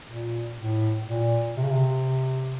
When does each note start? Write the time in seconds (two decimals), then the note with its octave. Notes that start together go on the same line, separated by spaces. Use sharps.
0.07 A#2
0.57 A2
1.07 A#2
1.57 C3
1.64 C#3
1.71 C3